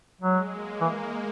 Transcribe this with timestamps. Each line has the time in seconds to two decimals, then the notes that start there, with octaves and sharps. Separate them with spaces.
0.20 F#3 G#3
0.51 A#3
0.81 E3 G#3